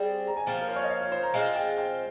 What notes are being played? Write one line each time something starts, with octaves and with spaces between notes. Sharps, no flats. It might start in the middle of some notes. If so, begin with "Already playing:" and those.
Already playing: G3 C4 G#4
A#5
G#5
F3 A#3 C#4 G5
A#4
C5
C#5
D#5
F5
C#5
C5
A#5
G#3 C4 F4 F5
G5
G5